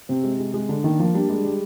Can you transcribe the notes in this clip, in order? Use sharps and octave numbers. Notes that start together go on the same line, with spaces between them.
C3 C4
G#3
G#3
G#3
D3 D4
D#3 A#3
F3 A#3
G3 D4
G3 G#3
G3